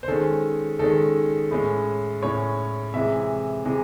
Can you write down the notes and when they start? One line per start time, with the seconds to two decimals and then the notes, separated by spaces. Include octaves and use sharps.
0.03 C5
0.08 D#3 G#3 C#4 A4
0.79 D#3 G#3 C#4 A4
1.51 A2 G#3 C#4
2.22 A2 G#3 C#4 C#5
2.94 C3 E3 G#3 E5
3.65 C3 E3 G#3